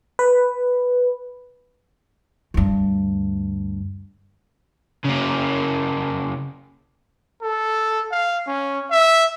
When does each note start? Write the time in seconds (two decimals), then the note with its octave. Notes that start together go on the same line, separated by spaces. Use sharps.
0.19 B4
2.54 D2 G2
5.05 C#3 A#3
7.42 A4
8.11 F5
8.47 C#4
8.91 E5